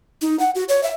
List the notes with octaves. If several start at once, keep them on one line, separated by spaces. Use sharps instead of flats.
D#4
F#5
F#4
C#5
E5